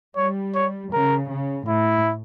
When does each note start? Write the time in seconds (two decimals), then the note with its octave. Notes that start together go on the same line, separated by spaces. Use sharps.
0.16 G3 C#5
0.55 C#5
0.93 C#3 A#4
1.30 C#3
1.68 A2 E4